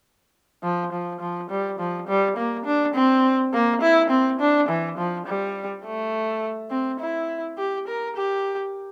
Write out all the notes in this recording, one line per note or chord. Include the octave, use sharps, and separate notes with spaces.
F3
F3
F3
G3
F3
G3
A#3
D4
C4
A#3
E4
C4
D4
E3
F3
G3
A3
C4
E4
G4
A#4
G4